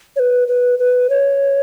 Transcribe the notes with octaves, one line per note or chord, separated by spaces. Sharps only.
C#5
B4
B4
B4
C#5